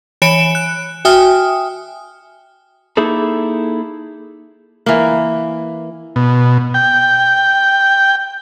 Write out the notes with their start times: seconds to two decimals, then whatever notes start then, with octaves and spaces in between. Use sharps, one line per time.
0.22 E3 C#5 G#5 B5 D7 E7
0.55 F#6
1.05 F#4 E5 G5 G#5 D#6 F6
2.97 A#3 D#4 E4 G#4 A4
4.86 E3 A#3
6.16 B2
6.74 G5